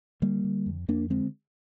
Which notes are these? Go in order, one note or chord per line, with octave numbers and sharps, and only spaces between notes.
D3 G3 A#3
D3
F2
F2 A#3 D4
D3 G#3 C4